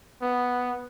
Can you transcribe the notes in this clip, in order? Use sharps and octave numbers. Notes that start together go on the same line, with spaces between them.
B3